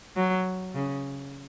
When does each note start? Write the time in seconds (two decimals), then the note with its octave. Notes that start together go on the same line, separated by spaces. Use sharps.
0.16 F#3
0.74 C#3